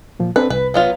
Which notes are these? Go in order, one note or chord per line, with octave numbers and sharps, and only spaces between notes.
A#2 F3
C4 D4 A4 B4
C2 B4
F#3 B3 F4